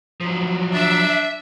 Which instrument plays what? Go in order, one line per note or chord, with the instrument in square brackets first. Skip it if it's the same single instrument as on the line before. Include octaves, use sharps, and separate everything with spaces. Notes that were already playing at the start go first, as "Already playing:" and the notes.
[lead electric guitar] F3 F#3
[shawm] D4 [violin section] E5